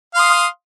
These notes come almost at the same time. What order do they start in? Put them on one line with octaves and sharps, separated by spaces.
F5 C6 D#6